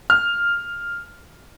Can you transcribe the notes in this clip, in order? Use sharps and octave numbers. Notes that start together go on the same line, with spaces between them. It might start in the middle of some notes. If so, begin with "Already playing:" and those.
F6